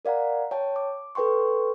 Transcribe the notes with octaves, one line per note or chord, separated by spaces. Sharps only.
A#4 D5 F5 F#5 A#5
C#5 G5 A5
D6
A4 B4 G5 C6 C#6